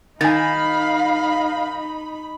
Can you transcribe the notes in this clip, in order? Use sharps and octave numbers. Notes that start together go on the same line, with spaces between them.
D#3 D#4 F5 G#5 B5 A6